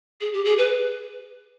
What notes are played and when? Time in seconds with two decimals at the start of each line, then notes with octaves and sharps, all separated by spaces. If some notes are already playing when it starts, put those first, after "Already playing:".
0.21 G#4
0.34 G4
0.45 G#4
0.58 B4